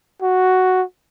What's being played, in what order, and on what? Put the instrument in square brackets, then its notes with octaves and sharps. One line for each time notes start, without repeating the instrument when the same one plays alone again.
[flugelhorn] F#4